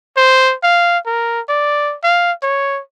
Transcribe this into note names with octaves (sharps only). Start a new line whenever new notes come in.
C5
F5
A#4
D5
F5
C#5